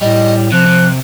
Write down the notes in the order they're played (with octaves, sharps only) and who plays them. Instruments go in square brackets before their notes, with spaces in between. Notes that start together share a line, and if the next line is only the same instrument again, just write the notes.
[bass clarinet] A2 [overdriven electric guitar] G3 [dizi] D#5
[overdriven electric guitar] C3 [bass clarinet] F3 [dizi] F#6
[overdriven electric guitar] C3